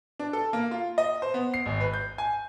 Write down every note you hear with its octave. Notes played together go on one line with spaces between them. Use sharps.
D4
A4
A#3
F4
D#5
C5
B3
C7
G#1
B4
G6
G#5